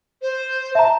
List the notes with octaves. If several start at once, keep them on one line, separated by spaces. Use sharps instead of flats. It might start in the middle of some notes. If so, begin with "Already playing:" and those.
C5
E5 A5 A#5